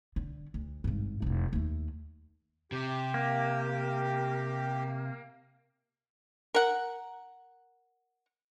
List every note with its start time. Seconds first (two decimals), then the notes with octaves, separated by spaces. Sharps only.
0.16 D3
0.54 D2
0.84 G#1 G2
1.22 F1 E4
1.53 D#2 A3
2.72 C3 G4
3.14 A#3
6.54 A#4 F#5